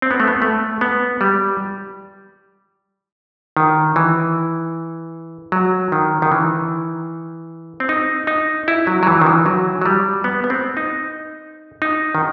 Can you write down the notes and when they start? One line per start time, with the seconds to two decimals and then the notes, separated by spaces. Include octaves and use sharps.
0.02 C4
0.11 B3
0.20 A3
0.27 B3
0.42 A3
0.81 B3
1.21 G3
3.57 D#3
3.96 E3
5.52 F#3
5.92 D#3
6.22 D#3
6.32 E3
7.80 C4
7.89 D#4
8.27 D#4
8.68 E4
8.87 F#3
9.03 F#3
9.07 E3
9.21 D#3
9.26 E3
9.46 F#3
9.82 F#3
9.86 G3
10.24 B3
10.44 B3
10.50 C4
10.77 D#4
11.82 D#4
12.15 D#3